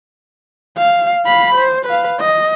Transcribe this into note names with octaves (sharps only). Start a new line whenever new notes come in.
F5
F5 B5
C5
B4 F5
D#5